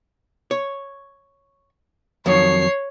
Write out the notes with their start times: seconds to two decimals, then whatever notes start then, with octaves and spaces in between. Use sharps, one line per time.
0.51 C#5
2.26 F2 D#3 F#3 C#5 C7